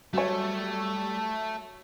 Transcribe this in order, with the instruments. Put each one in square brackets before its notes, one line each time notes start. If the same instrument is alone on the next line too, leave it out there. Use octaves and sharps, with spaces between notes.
[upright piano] F#3 C#5 [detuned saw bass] G3 [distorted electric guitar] A3